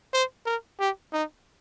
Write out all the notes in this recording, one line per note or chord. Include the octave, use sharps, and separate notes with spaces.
C5
A#4
G4
D#4